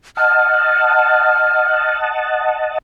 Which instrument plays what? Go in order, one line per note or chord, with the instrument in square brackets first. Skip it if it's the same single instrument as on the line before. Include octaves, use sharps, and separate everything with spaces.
[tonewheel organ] D#5 F#5 A5 [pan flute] F6